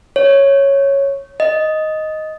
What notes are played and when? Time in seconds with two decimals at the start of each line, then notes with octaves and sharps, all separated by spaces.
0.16 C#5
1.40 D#5